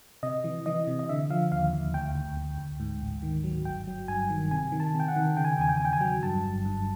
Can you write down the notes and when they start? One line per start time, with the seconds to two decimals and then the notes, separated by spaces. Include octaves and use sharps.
0.23 C3 D#5
0.44 E3
0.66 E3 D#5
0.87 C3
0.99 D#5
1.09 D3 E5
1.30 F3 F5
1.52 D#2 F5
1.73 D#2
1.94 D2 G5
2.15 D2
2.37 D2
2.58 D2
2.80 G#2
3.01 A1
3.23 D#3
3.44 F#3
3.65 G1 G5
3.87 F#3
4.08 G2 G#5
4.30 D#3
4.51 C3 G#5
4.72 D#3
4.80 A5
4.94 C3
5.00 G5
5.08 F#5
5.16 D#3
5.37 C#3 G5
5.45 G#5
5.53 G5
5.58 E2 G#5
5.69 G5
5.77 E2 G#5
5.85 G5
5.93 G#5
6.01 F#3 G5
6.22 G2 A5
6.44 G1
6.65 G2